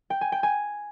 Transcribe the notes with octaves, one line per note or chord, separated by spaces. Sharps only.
G5
G#5
G5
G#5